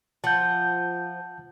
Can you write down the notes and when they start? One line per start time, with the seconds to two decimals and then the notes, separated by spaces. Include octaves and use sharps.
0.24 F3 F#5 A5 G6